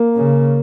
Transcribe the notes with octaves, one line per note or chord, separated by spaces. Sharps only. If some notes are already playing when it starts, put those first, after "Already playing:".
Already playing: A#3
C#3